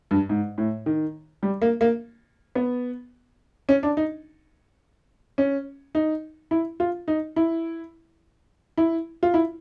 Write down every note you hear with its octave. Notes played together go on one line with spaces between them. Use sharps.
G2
G#2
A2
D#3
G3
A#3
A#3
B3
C#4
D4
D#4
C#4
D#4
E4
F4
D#4
E4
E4
F4
E4